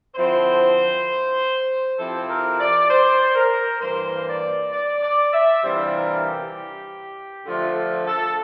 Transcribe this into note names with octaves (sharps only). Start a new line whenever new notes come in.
D3 F3 C4 E4 C5
C3 F3 C4 E4 A4
A#4
D5
C5
A#4
G2 E3 A#3 C5
D5
D5
D5
E5
C3 E3 G3 D4 F4 C5
A#4
G4
D3 F3 A3 D4 F4
A4